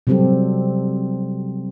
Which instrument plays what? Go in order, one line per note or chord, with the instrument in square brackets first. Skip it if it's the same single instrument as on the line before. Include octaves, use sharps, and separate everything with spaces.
[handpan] C3 F#3 G3 C4 G4 A4